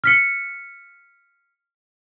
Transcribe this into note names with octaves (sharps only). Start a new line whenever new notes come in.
F6 B6 C#7